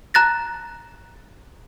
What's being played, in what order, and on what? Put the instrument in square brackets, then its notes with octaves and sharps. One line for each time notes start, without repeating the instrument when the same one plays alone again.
[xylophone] A5 A#5 F#6 A6 A#6